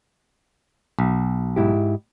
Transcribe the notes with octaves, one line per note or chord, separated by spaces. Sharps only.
B1
G#2 E4 G4